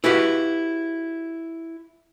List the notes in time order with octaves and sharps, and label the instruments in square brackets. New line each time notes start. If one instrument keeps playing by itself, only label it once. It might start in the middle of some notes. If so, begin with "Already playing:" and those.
[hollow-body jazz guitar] E4 F#4 G4 B4 F5